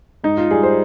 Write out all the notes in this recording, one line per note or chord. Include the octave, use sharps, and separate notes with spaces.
G#2 D#4
F4
G3 G#4
C5